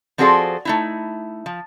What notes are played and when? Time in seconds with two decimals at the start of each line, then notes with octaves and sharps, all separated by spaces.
0.18 F3 C4 F#4 G#4 A4 D5
0.65 A3 D#4 E4
1.46 F3